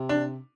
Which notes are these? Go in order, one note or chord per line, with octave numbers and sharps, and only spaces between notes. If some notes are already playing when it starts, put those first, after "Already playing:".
Already playing: C3
D4